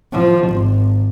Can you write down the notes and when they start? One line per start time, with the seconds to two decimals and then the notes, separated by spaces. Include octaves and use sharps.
0.12 F3
0.48 G#1